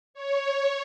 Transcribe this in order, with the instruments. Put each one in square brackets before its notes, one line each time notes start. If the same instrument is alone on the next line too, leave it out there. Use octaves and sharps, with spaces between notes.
[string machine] C#5